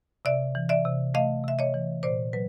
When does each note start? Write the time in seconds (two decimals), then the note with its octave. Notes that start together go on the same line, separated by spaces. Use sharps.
0.25 C3 D5 E5
0.55 E3
0.69 D5 E5
0.85 C3
1.14 A3 D#5 F5
1.44 C3 E5
1.59 C#5 D#5
1.74 E3
2.03 A#2 C5 D5
2.33 F#3 B4